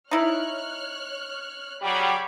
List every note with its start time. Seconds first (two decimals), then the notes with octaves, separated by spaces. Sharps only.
0.11 D#4 E4 C#5 F6 F#6
1.82 C#3 F#3 G3 B5 D6 G#6